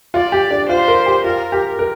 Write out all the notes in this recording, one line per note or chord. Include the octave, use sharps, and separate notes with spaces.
F4 D5
G4
D4
F4 C5
A#4
G4
F4 A#4
G4
A#4